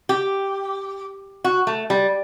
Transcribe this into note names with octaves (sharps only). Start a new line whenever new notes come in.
G4
F#4
A3
G3